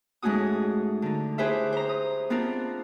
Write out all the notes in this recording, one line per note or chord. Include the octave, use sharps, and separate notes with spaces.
G#2 G#3 A3 C#4 F#4 D#6
D3 D#4
E4 G4 G#4 B4 C5 E5
C5 A#5
D#6
B3 C4 D4 F4 A#4